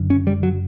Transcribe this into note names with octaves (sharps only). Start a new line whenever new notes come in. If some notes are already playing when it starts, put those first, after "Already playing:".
Already playing: F#1 F#2 D3
C#4
G3
F#3